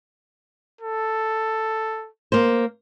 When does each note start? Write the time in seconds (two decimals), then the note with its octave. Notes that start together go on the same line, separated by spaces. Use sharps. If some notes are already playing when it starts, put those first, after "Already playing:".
0.81 A4
2.32 A#3 C5